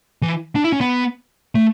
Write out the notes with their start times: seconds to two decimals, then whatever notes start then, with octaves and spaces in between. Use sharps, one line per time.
0.22 E3
0.56 D4
0.64 E4
0.72 C#4
0.81 B3
1.55 A3